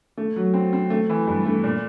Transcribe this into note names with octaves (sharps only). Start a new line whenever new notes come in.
A3
F#3
C4
C4
A3
E3
G2
A3
A#2